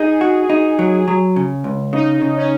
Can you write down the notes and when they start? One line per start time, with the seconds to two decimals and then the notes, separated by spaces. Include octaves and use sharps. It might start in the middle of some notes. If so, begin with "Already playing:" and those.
Already playing: D#4 G#4
0.21 F#4
0.50 D#4
0.79 F#3
1.08 F#3
1.36 C#3
1.64 C#2
1.93 C#3 D#4
2.22 C#3
2.37 C#4